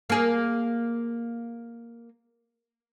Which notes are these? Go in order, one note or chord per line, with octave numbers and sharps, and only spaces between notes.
A#3 G#4